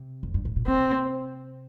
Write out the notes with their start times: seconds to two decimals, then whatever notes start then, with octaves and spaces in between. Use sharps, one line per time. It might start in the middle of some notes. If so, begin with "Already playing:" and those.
Already playing: C3
0.23 F2
0.34 G2
0.45 A2
0.56 A#2
0.67 C3 C4